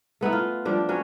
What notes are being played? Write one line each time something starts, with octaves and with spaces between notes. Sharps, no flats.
A3 B3 D#4 E4
F4
F3 G3 D4
F#3 C#4